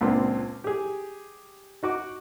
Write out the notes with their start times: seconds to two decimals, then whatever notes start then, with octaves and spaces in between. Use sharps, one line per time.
0.01 C#2 A#2 C4 D4
0.64 G4 G#4
1.83 D#4 F#4 D6